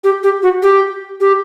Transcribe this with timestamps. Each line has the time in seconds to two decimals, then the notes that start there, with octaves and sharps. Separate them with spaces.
0.04 G4
0.23 G4
0.43 F#4
0.63 G4
1.21 G4